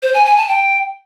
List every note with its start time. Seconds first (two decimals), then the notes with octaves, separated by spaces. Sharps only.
0.03 C5
0.14 G#5
0.26 G#5
0.37 A5
0.48 G5